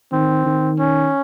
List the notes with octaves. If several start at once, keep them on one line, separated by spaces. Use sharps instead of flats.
D#3 C4
D#3
C#4